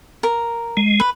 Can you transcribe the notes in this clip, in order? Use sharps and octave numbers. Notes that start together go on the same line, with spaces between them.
A#4
G#3
B4